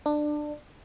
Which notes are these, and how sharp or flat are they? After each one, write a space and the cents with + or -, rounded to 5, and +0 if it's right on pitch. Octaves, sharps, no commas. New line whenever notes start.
D4 +20